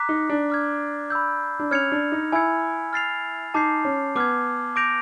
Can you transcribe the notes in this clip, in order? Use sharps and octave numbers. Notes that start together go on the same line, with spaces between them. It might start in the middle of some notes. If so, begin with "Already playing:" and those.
Already playing: A#5 D6 F#6 B6
D#4
D4
D6 F6 G#6
B5 E6 G6
D4
C#4 F6 G#6 C#7 F7
D4
D#4
E4 G#5 B5 E6 G#6 C#7
F6 A6 C7 F7
D#4 A5 D6 G6 C7
C#4
B3 D6 F6 G#6
D6 G6 A#6 D7 F7